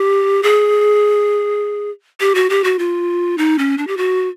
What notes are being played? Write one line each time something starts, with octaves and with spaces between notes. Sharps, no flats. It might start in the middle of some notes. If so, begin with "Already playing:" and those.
Already playing: G4
G#4
G4
F#4
G4
F#4
F4
D#4
C#4
D4
G4
F#4